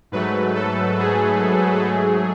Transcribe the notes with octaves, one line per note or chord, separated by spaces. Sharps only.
G#2 F#3 A3 B4
A4
G#4
G#2 F#3 A3